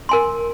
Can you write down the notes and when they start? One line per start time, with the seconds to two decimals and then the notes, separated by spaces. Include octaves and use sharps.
0.09 A#4 G#5 C6